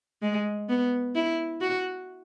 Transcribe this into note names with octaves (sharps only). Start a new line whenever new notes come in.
G#3
B3
E4
F#4